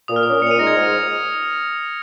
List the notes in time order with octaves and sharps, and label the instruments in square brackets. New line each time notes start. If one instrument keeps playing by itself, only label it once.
[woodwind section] A#2 [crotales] D#6
[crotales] F6
[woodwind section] A#3 C#4 [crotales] D#6
[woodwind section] A#2 [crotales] C#7
[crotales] F7
D#7
[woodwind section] G#3 D#4 [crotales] A#6
[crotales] G#6
[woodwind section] G#2